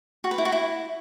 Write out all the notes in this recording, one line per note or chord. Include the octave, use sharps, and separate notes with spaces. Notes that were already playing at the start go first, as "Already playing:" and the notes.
F#4
B4
E4
F#4
E4